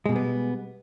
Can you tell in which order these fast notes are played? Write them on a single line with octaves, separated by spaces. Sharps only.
G#3 B2 G3 B3